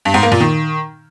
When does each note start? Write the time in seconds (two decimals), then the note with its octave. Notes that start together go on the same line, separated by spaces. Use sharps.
0.05 G2
0.14 G#2
0.23 A#3
0.32 A#2
0.40 D#3